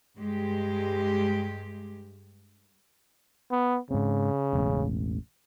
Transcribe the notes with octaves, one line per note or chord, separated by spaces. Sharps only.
G2 G#3 G4
B3
G#2 C#3 C4
E1 A1